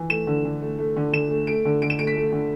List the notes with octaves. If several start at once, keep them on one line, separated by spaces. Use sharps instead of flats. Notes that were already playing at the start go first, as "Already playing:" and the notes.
Already playing: E3
A3 E7
D3
D3
A3
A3
D3
D3 E7
A3
A3 D7
D3
D3 D7
E7
A3 D7
B6
A3
D3